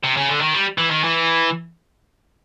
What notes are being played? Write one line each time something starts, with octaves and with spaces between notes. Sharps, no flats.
C3
C#3
D3
D#3
G3
E3
D#3
E3